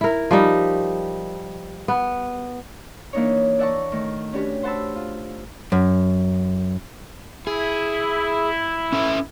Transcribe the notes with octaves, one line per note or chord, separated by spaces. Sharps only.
E4 A#4
F3 G3 D#4
B3
E3 A#3 D4 D#4 C#5
D5 E5 F#5 A5 A#5 C#6
D#3 A3
C#4 D4 F#4 G4 B4
C5 F#5 A5 B5 E6
F4
F#2
E4 G#4
C#4 A4 E5